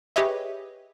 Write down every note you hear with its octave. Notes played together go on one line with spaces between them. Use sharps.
G4 G#4 B4 C#5 D#5 E5